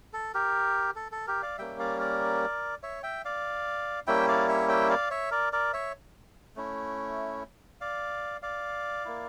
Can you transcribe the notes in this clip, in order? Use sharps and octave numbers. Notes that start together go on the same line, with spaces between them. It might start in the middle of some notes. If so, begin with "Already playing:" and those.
A4
G4 A#4
A4
A4
G4 A#4
D5 F5
G3 A#3 C#4 E5 G5
D5 F5
A#4 D5
C#5 E5
E5 G5
D5 F5
G3 A#3 C#4 E4 E5 G5
D5 F5
C#5 E5
E5 G5
D5 F5
C#5 E5
A#4 D5
A#4 D5
C#5 E5
A3 C#4 E4
D5 F5
D5 F5
A#3 E4